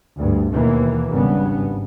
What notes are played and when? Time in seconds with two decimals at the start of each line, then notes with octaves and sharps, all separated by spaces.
0.18 D2 G2
0.52 D#2 B2 E3 A#3
1.09 G#1 G2 C#3 B3